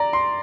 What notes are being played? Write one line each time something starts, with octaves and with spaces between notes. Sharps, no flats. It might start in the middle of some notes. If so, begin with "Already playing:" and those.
Already playing: D5 A#5
C6